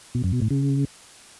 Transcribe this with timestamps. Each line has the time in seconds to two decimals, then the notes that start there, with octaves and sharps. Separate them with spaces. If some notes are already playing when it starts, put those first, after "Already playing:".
0.15 B2
0.24 F#2
0.33 B2
0.42 A2
0.50 C#3